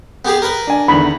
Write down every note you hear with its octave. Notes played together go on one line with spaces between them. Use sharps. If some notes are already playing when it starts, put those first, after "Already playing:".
B3 G4 G#4
A#4 B4
D4 G#5
E2 D3 D#3 B5